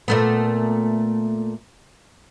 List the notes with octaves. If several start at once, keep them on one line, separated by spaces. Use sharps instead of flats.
A#2 A3 B3